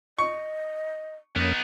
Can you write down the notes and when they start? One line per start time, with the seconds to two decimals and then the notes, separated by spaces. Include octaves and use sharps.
0.19 D#5 C#6
1.36 F2 A#3 B3 C#4 D#4